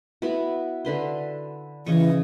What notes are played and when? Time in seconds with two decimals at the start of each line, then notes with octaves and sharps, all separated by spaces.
0.22 B3 E4 F#4
0.85 D3 B4 C6
1.86 C#3 E3 D#5 C#6